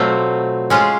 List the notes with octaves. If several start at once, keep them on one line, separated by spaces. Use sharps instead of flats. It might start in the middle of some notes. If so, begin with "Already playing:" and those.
Already playing: B2 F#3 A3 C4 F4
G#3 C#4 F4 G#4